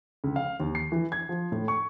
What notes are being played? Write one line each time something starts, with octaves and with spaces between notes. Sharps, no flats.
C#2
F5
D#2
C7
E3
G#6
F3
A2
C#6